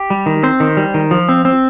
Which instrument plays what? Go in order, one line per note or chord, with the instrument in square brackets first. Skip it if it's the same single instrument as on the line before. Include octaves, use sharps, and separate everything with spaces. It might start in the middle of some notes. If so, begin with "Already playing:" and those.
Already playing: [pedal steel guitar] G4
G3
D#3
C4 C5
D#3
G3
D#3
F3
C4
C4